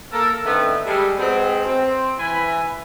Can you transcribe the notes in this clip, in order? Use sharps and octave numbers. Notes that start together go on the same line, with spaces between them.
A#3 A4 A#4
D3 D#3 A3 B3 C4
G3 G#3 A4
B2 G#3 B3 C4
C4
E3 G#5 B5